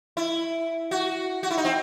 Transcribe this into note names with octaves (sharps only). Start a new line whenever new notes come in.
E4
F#4
F#4
E4
D#4
C4